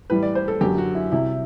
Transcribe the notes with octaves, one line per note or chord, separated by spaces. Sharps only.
A2 E3 G3 B4
D5
C5
A4
F#2 D3 F#3 G4
F#4
E4
C2 C3 F#3 E4